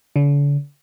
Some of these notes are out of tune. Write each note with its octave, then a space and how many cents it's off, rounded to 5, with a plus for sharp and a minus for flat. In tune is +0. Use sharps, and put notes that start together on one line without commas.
D3 -45